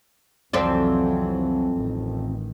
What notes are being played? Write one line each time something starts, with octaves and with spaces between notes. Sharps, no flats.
C2 F2 E3 F#3 C4 D5
A1 D#3